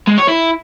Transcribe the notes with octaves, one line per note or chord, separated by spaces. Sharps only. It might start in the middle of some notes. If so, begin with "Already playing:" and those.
G#3
C#5
E4